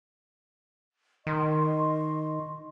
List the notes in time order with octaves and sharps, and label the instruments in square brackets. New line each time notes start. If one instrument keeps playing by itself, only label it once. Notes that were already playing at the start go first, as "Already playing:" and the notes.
[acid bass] D#3 [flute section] D#5 C6 C#6